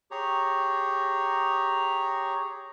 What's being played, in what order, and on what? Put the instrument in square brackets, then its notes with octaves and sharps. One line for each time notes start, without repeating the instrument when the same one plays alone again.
[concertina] G4 G#4 C#5 A#5